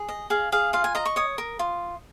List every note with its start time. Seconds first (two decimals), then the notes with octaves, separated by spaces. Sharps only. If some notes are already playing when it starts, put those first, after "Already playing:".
Already playing: G#4
0.09 D#5
0.30 G#4 F5
0.52 G#4 F5
0.73 F4 F5
0.84 G#5
0.95 D#5 A#5
1.05 C#6
1.16 C#5 D#6
1.38 A#4
1.59 F4